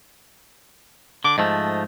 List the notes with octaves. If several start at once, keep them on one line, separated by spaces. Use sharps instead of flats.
D3 D6
G#2 F3 A3 D#5